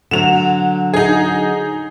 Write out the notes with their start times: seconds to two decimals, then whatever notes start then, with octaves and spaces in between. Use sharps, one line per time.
0.11 D3 F#3 E7 F7
0.94 D#4 G#4